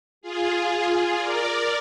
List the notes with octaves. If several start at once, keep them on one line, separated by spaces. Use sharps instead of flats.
F4 G#4
A#4 D5